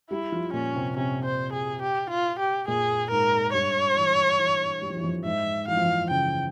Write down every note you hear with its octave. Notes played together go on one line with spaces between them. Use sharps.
G3 E4 G4
F3 F4
A#2 A#3 C#4
C3 C4
C3 C4 C#4
C5
G#4
G4
F4
G4
A#2 A#3 G#4
G#2 G#3 A#4
G2 G3 C#5
E3
E3
G3
F3
E3
F2 F3
G#2 G#3 E5
E3 F5
F3
E3
C#3 G5